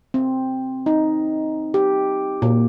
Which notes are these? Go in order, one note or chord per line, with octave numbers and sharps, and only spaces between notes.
C4
D#4
G4
A#2